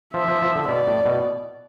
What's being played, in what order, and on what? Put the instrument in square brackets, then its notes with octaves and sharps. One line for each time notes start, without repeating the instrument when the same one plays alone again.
[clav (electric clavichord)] F3 [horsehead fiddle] E5
[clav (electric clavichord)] F3
F3
D3
[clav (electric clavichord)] B2 [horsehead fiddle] D5
[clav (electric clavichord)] A2
B2